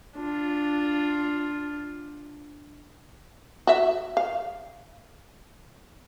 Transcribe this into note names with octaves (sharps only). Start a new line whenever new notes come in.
D4 F4
F#4 E5
F5